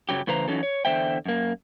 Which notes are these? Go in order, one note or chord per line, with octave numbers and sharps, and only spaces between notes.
F#2 C#3 F#3 G4
A2 C#3 E3 B4 C5 A#5
E3 F#3 C#4 D#4 A4
C#5
E2 D3 A3 C5 E5 G5
F#2 A#3